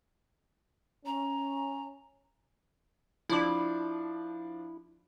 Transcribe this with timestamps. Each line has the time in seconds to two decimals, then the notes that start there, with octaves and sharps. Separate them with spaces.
1.06 C#4 A#5
3.29 F3 D4 E4 D5